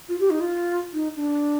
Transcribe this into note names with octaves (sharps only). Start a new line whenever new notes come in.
F4
G4
D#4
F4
D#4
D4